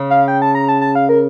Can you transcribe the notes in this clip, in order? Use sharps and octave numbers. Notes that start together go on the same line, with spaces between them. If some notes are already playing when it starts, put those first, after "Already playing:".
Already playing: C#3
F5
G5
A5
A#5
A5
A5
F5
A#4